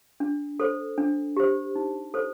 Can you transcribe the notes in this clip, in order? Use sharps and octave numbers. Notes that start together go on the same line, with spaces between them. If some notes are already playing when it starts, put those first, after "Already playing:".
D4
A4 C5
D4
G4 C5
D#4
A4 C5